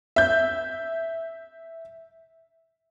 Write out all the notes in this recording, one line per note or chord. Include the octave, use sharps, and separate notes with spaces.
E5 G6